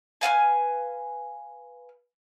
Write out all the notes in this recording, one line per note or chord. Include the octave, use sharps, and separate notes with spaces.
B4 C#5 F5 G#5